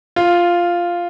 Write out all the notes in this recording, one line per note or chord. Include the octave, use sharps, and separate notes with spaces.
F4